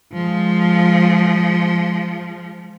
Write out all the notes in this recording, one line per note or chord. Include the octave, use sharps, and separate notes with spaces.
F3 G#3